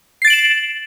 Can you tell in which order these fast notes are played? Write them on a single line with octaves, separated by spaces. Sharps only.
C7 A6 D7 F#7 E7